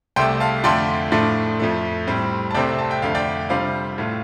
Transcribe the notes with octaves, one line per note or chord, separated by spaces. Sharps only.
C2 C3 A3 G5 C6
F5 A5
F2 D3 A3 D4 F4 G5 C6
A2 F3 A3 D4 F4
F2 F3 A3
A2 G3 C4
A5
C2 C3 A3 C4 D5 G5
A5
G5
F2 D3 A3 F5
D5 G5
C3 G3 D4 F4 C5 F5
A2 A3 F4